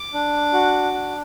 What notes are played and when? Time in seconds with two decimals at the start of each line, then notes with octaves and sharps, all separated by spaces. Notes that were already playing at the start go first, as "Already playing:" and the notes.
Already playing: D6
0.14 D4
0.53 F#4
0.94 D4